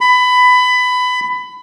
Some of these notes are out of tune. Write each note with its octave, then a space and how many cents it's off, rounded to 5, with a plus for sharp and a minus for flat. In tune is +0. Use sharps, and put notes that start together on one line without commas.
B5 +20